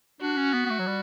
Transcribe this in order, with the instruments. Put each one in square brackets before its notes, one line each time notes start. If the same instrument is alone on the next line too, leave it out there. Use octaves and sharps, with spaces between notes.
[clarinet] D4 [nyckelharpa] F#4
[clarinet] C#4
B3
B3
A3
F#3
G3